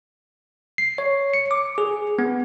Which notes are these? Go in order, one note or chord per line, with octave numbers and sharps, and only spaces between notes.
C7
C#5
C#7
D6
G#4
B3